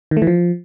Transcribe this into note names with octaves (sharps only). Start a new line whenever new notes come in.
D#3
A3
E3
F3